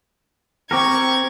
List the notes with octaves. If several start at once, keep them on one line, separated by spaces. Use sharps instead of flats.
C4 G4 A#4 C#6 G#6